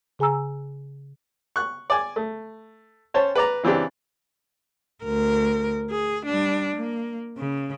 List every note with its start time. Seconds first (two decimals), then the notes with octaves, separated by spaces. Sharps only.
0.19 C#3 G#4 G#5 A#5 E6
1.56 C#6 F#6
1.90 D5 G#5 D6
2.16 A3
3.14 C#4 C5 C#5 A5
3.35 B4 D5 A#5
3.63 C#3 E3 C4 D4 G4
5.04 D2 A#4
5.91 G#4
6.26 G3 D4
6.76 A#3
7.38 C#3